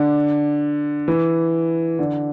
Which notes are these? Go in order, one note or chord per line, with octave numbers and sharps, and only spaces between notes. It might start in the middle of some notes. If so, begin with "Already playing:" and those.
Already playing: D3
E3
D3